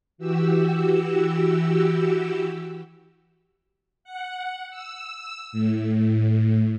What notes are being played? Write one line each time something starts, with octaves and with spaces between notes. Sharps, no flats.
E3 F#4 G4 E6
F#5
E6
A2